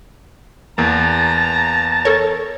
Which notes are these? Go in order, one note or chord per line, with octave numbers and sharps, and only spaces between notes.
E2 A#3 A5 A#5
A4 A#4 C#5